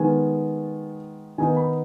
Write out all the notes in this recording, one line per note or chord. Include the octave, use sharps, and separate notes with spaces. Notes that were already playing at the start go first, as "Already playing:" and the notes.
Already playing: D#3 G#3 B3 G#5
D#3 B3 D#4 G#5
B5